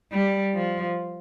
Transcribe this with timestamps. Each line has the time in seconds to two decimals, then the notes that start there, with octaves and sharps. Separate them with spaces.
0.12 G3
0.54 F3